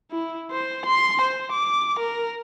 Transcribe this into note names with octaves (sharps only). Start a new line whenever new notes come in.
E4
C5
C6
C5
D6
A#4